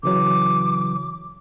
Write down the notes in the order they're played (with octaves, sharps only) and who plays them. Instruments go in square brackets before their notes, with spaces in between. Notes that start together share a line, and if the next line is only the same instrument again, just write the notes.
[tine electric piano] C#3 E3 F#3 [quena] D6